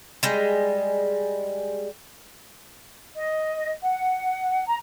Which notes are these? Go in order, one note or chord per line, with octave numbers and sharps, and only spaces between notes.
G3 G#3
D#5
F#5
A#5